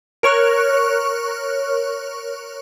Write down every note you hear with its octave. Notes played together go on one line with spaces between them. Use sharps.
A#4 C#5 C#6 F6 F#6